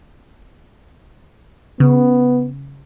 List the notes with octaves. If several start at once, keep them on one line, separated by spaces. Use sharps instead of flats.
C#3 B3